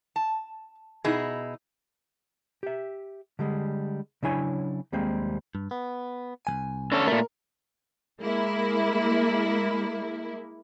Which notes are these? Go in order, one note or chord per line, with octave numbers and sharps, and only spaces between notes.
A5
B2 D#4 E4 G#4
G4 E5
D3 G3 G#3
C#3 F#3 D4 E4 C#5 G#5
D#2 G3 G#3 A#3 C4
G2
B3
C2 F3 G#5
D3 C#4 A4
A#2 A3 A#4
G#3 A#3 E4